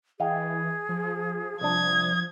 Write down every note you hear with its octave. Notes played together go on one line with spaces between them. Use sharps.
E3 G#4 D#5 F5 G5
F3
C2 D4 D#6 G#6